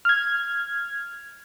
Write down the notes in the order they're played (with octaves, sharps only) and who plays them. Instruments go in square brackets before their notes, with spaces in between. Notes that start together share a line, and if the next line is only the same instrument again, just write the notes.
[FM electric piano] F6 G#6